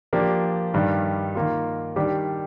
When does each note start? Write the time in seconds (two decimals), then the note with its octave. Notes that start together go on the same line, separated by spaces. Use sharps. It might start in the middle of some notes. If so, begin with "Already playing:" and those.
0.13 F3 A#3 D4 G4
0.74 G2 D#3 G3
1.35 D#3 A#3 F4
1.96 D#3 G3 D4 G4